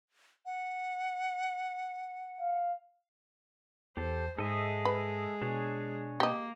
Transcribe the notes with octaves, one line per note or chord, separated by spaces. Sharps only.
F#5
F5
E2 G4 A4 C5
G#2 G#3 A4 D#5 E5
B4
B2 D4 G#4 C#5
A#3 G4 D#5